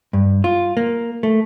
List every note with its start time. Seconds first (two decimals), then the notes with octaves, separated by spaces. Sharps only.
0.13 G2
0.44 F4
0.77 A#3
1.23 A3